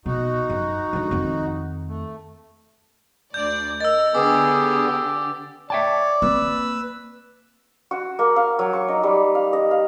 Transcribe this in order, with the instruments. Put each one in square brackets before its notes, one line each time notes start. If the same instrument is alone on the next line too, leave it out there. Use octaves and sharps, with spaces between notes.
[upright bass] B2 [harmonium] D#4 F#4
[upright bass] F#2
D3 G#3
F2 D#3
[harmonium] A3
[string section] D2 D5 [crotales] G6
[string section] A#4 [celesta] D#5 [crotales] E6 A6
[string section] D3 G4 [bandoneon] B3 G#4 [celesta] B4 G#5 [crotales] D6
[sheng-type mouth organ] C#5 [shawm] D5 [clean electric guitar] E5 G5 A5
[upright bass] A#3 C4 [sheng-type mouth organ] B4 E6
[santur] F#4
A#3
F5
F#3
C#6
D#4
G3
F5
D#5
F5